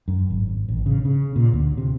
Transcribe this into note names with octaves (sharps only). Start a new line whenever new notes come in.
F#2
G#1
A1
C#3
C#3
A#2
D2
C3